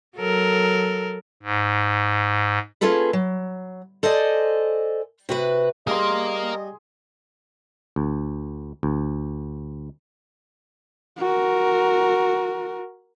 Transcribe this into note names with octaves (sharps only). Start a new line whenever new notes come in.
F#3 A4 A#4
G#2
A#3 C#4 F4 G#4 A4 B4
F#3
A4 C5 D5 D#5 F#5 G#5
C3 F#4 B4
G3 G#4 A#4 D#5 F5 C6
D2
D2
F#4 A#4